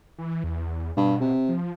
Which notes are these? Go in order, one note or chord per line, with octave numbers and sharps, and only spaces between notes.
E3
E2
G2 B2
C3
F3